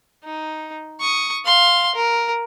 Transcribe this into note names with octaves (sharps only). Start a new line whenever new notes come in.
D#4
C#6 D#6
F5 C6
A#4